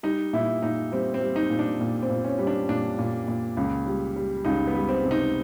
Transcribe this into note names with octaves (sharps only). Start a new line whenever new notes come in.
G3 D#4
A#2 E4
A#2 D#4
G3 C4
C4
G3
D#4
A#2
D4
A#2
C4
A#2
C#4
G3
D4
A#2 D4
A#2
A#2
C#2
G3
G3
C#2 D#4
B3
G3
C4
C3
D#4